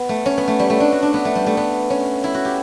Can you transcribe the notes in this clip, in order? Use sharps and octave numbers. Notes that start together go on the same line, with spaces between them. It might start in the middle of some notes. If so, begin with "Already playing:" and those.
Already playing: B3
A3
C#4
B3
A3
G3
A3
D4
F#4
D4
B3
A3
G3
A3
B3
C#4
E4
F#4
G4